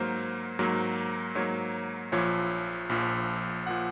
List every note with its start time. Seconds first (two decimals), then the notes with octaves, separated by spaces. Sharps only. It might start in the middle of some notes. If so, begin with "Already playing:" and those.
Already playing: G#2 F#3 A#3 A#4 C5
0.59 G#2 F#3 A#3
1.35 G#2 F#3 A#3 C#5
2.12 A#1 A#2 F3 C#5
2.89 A#1 A#2 F3
3.67 A#2 F3 F#5